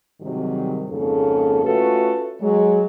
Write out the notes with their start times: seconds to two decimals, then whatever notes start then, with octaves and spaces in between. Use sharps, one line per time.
0.21 G#2 C3 D#3 F#3 G3
0.89 F2 G#2 C#3 A#3 A4
1.63 A3 C#4 F4 F#4 A4 B4
2.40 F#3 G#3